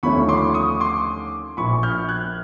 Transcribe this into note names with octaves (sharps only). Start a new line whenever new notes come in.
D#2 D3 F3 A3 C#4 B5 C#6
C6 D6
C#6 D#6
C6 D6
A#1 A#2 F3 B5 C#6
F6 G6
F#6 G#6